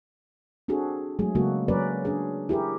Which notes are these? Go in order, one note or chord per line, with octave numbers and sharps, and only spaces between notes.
C4 D4 F#4 G#4 A4
F#3 G#3 A3 G#4
C#3 F#3 G#3 A#3 F#4 A4
F#3 A#3 C#4 A#4 B4 D5
C#4 D4 G#4
E4 G4 G#4 A#4